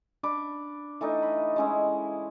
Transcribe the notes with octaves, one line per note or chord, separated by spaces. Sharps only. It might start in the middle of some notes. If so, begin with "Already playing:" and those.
D4 B5 D6
E3 A3 D4 D#4
B5
G#3 C#4 E4